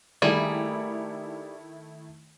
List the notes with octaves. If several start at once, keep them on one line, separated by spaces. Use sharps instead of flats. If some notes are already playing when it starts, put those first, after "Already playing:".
D#3 G3 A3 A#3 E4 G#4